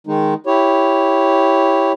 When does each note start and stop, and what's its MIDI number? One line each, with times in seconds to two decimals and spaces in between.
0.07 0.34 51
0.07 0.34 56
0.07 0.34 63
0.47 1.92 64
0.47 1.92 67
0.47 1.92 73